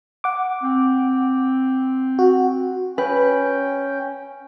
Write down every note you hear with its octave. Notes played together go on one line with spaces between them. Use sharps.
F#5 D6
C4
F#4
C#4 B4 G5